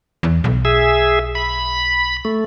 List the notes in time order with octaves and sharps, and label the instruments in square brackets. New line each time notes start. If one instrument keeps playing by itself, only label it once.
[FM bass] E2
B1
[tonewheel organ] G#4 E5
B5
A3